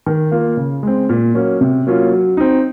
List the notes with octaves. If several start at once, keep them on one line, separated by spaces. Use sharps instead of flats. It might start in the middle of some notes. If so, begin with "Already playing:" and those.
D#3
A#3 F4
C#3
G#3 C4
A#2
F#3 A#3 C#4
C3
F#3 A#3 C#4 F4
F#3
C4 D#4